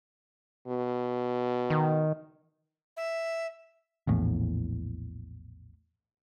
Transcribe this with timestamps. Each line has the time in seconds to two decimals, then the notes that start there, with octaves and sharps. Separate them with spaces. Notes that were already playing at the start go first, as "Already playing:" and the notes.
0.67 B2
1.70 D#3
2.97 E5
4.07 A#1 E2 A2